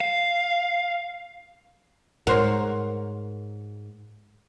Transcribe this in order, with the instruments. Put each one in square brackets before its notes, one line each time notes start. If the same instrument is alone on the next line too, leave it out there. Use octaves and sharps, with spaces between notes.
[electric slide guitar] F5
[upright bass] G#2 [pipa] F#4 C5 C#5 [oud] A#4